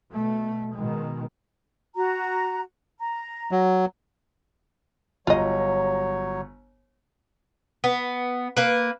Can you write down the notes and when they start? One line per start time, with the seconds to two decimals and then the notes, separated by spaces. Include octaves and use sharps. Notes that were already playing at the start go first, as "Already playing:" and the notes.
0.11 B2 A3
0.76 B2 D#3 G#3
1.95 F#4 A#5
2.99 A#5
3.51 F#3
5.27 G1 F#3 F4 C#5 D#5 A#5
7.84 B3
8.57 A#3 B4